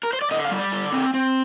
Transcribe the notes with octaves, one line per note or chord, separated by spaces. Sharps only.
A#4
C5
D5
D3 D#5
F5
G3
D5
D3
C4
C4